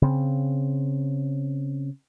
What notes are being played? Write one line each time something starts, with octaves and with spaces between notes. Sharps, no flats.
C#3 C4